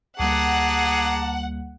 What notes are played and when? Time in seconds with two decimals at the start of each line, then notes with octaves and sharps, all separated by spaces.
0.19 D2 G3 A#3 G#4 F#5 A5 A#5 D6